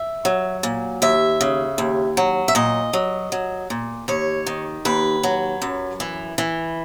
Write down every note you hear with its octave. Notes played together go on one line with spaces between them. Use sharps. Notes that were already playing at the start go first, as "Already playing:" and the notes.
Already playing: E5
F#3
A#2
D#2 E5
C#3
D#2
F#3
E5
A#2 D#5
F#3
F#3
A#2
D#2 C#5
D#3
D#2 B4
F#3
F#2
E3
E3